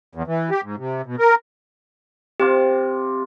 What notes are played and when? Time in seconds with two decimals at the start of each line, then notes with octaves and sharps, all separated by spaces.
0.15 E2
0.27 E3
0.51 G4
0.63 G#2
0.78 C3
1.06 B2
1.19 A#4
2.40 C3 F4 G4 D6